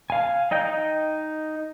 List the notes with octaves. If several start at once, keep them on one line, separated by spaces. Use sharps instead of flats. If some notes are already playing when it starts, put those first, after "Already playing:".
F5 G#5
D#4 D#5 G5 G6